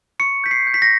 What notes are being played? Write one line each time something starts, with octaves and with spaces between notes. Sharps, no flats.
C#6 C#7
G6 B6
C7
G6
B6
A#6